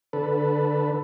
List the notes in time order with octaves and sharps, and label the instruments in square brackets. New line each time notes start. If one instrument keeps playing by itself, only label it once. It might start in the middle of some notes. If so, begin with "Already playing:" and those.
[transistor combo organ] D3 A4 B4